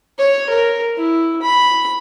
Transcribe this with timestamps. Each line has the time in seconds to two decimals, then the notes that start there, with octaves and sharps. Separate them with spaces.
0.18 C#5
0.50 A#4
0.97 E4
1.42 B5